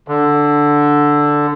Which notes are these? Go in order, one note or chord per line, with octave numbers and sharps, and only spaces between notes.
D3